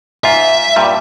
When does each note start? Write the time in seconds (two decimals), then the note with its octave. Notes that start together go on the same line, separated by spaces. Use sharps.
0.24 G#2 F4 E5
0.76 G2 A#2 G3